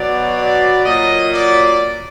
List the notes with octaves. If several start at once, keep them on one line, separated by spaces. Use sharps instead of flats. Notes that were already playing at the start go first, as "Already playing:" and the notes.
Already playing: B2 F#3 D5
D5
A#2 F#3 D#5
D5